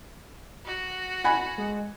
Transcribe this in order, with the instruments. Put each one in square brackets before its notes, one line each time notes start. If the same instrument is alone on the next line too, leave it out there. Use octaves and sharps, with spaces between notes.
[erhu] F#4
[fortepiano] F#5 G#5 B5
[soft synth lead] G#3